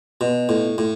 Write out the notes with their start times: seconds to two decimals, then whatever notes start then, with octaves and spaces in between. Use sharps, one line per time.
0.21 B2
0.49 A2
0.78 A2